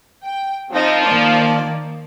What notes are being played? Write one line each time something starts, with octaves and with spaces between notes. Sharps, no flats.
G5
F3 C4 D#4
D#3 A#3 D5